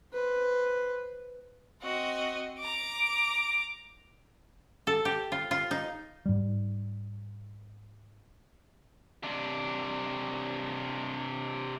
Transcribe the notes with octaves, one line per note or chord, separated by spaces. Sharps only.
B4 C5
C4 F#4 D#5
A#5 D6
A4
G4
F4
F4
D#4
G#2 G3
C3 D4